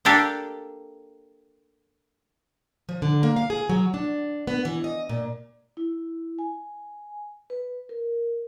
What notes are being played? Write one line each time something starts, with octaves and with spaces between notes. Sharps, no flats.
A#3 D4 G4 A4
F3
D3
A#3
F5
G#4
F#3
D4
B3
E3
D#5
A#2
E4
G#5
B4
A#4